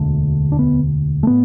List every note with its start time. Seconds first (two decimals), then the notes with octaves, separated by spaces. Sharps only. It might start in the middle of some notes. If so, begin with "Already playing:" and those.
Already playing: E1 D2 D3
0.52 D4
0.59 B3
1.23 A3
1.27 A2 B3